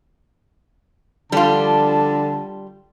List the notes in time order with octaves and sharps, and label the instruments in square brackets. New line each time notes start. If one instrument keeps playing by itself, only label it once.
[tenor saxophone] D3 [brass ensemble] F3 D4 A5 [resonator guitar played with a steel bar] G3 F4